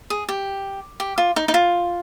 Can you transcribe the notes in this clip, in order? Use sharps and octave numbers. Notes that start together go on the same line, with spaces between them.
G#4
G4
G4
F4
D#4
D#4
F4